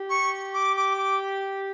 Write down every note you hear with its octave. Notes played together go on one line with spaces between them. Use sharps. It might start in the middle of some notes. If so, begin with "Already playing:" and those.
Already playing: G4
C#6
D6
D6
D6